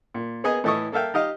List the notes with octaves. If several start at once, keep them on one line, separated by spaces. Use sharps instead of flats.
A#2
A#3 B3 G#4 D#5 G#5
A2 E3 A4 D#5 C#6 D#6
A#3 A4 E5 F5 G5
D#4 G4 D#5 F5